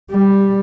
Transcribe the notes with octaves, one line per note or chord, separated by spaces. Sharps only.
G3